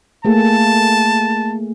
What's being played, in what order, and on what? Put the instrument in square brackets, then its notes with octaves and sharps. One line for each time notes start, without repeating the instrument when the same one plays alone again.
[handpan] A3 A#3 G#4 [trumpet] A5